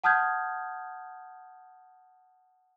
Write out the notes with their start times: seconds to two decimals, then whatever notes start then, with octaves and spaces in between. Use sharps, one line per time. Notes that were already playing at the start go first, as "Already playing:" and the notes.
0.04 F#5 A5 D#6 F6 G6 G#6